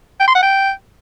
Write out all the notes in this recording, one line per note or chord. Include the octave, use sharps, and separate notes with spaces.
G5
C6
F#5
G5